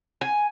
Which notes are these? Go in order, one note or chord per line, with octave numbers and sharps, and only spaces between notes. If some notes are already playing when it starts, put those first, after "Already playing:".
G#5